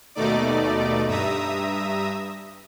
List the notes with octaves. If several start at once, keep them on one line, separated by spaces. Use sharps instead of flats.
D#2 B2 A3 D#4 D5 D6
G2 E5 A#5 D#6